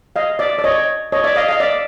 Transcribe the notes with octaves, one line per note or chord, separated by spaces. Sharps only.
D#5 F5
D5 E5
D5
C#5 D#5
C#5 D#5
D5 E5
D#5 F5
D#5 F5
D5 E5